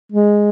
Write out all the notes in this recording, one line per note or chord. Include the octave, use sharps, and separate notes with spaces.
G#3